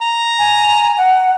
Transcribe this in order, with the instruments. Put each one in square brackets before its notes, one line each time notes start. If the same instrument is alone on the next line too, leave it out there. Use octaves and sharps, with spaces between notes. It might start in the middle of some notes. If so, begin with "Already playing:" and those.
[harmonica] A#5
[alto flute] G#5
F#5